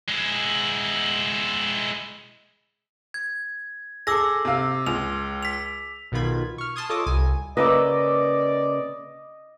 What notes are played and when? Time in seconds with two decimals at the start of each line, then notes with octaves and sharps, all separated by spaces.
0.08 G#3 E4
3.14 G#6
4.07 G#4 A4 D6 E6 A#6
4.45 C3 F5
4.87 C#2 F7
5.43 B6 F7
6.12 B1 B2 D#3 F4 B5 G#6
6.58 C#6 F6
6.76 G#5 A5 C6 D#6 G#6
6.89 F4 A4 C#5 D#5 D6 D#6
7.06 C2 G#5
7.57 C#3 A#3 B4 D5 D#5 D6 E6